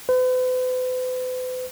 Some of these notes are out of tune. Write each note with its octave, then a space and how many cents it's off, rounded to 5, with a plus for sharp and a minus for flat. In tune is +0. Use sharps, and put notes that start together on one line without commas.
B4 +45